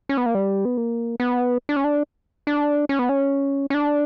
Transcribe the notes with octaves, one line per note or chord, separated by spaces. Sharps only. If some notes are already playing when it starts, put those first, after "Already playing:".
C#4
B3
A#3
G3
B3
A#3
B3
D4
C#4
D4
D4
C#4
B3
C#4
C#4
D4